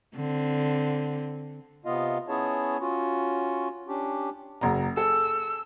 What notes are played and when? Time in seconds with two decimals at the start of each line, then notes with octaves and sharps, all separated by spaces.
0.16 D3 C4
1.86 C3 B3 F4 D#5 F5
2.28 B3 C#4 E4 G#4 C#5 A5
2.81 C#4 F4 F#4
3.88 C#4 D4 G4
4.61 F#1 F#3 A#5
4.97 G#4 A4 E6